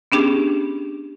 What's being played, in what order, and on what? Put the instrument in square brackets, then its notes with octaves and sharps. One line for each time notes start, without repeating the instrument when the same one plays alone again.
[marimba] B3 C#4 D4 G4 G#4